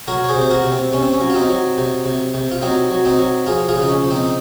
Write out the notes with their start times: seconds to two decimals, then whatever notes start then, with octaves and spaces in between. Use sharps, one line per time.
0.08 F#3 F#4 A#4
0.24 C#5
0.28 G#4 C5
0.36 C3
0.41 C5
0.50 F#4 A#4
0.64 C3
0.72 C4
0.92 C3 C#4
1.03 C4
1.13 C#4
1.21 F#3
1.30 F4
1.34 C4 D#4
1.49 F#3
1.78 C3
2.05 C3
2.34 C3
2.51 F4
2.62 F#3 C4 D#4
2.91 F#3
3.05 C4 D#4
3.19 F#3
3.46 F3 F4 G#4
3.69 F4 G#4
3.76 C#3
3.82 D#4
3.89 C#4
4.04 F3
4.10 C4 D#4
4.23 D#4